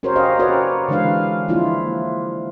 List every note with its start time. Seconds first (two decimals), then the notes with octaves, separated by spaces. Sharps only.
0.03 C#4 F#4 A#4 C5 C#5
0.16 G4 D#5 F5
0.39 C#4 F#4 A#4 B4 C#5 D5
0.89 D3 E3 G#3 D4 B4 F5
1.48 F3 A#3 D4 E4 F4